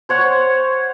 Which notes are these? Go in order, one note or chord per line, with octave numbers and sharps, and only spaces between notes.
C5 C#5 F#5 C#6